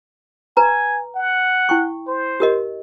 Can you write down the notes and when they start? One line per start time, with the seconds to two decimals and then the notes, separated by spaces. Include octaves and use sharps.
0.57 B4 G#5 A#5
1.15 F#5
1.69 E4 G5 C#6
2.07 C5
2.40 G4 A#4 D#5